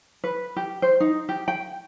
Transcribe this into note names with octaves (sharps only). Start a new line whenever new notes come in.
B4
G4
C5
D#4
G4
G5